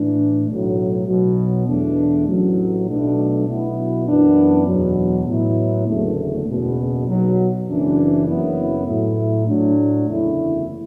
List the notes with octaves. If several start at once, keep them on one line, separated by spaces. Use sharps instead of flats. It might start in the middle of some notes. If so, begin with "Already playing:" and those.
Already playing: A2 E3 D4
B1 A2 F#3
B1 B2 F#3
E2 B2 A3 D4
A1 A2 F#3
B1 B2 A3 D4
B1 B2 B3 E4
F#2 E3 B3 D4
E2 B2 F#3
A2 F#3 B3 E4
F#1 E2 D3 A3
F#1 E2 B2
B1 B2 F#3
F#1 F#2 E3 D4
F#1 F#2 F#3 B3 E4
A2 F#3 A3 E4
A2 F#3 D4
F#1 E2 D3 A3 E4